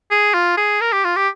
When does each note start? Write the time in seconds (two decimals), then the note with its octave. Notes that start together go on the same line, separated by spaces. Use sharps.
0.11 G#4
0.34 F4
0.57 G#4
0.81 A#4
0.92 G4
1.04 F4
1.16 G4